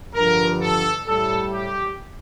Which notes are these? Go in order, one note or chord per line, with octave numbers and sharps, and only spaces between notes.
G2 D3 F3 A#4
A4
A2 G3 A4
G4